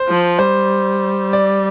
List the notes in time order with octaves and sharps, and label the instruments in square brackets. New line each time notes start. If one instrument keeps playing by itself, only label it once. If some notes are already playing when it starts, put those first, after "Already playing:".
Already playing: [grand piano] C5
[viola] F3
[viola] G3 [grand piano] C5
[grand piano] D5